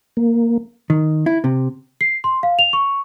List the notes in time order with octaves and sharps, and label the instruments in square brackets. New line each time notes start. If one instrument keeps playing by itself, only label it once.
[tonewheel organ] A#3
[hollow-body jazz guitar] D#3
E4
C3
[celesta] C7
C6
F5
F7
C#6